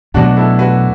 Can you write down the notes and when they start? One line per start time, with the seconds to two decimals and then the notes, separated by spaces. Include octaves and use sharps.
0.14 E2 B2 F#3 A3 D4 F#4
0.37 E4 A4
0.59 F#4 B4